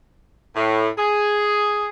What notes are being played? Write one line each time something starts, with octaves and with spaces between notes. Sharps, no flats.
A2
G#4